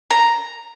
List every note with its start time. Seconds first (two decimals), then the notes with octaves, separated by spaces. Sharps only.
0.11 A#5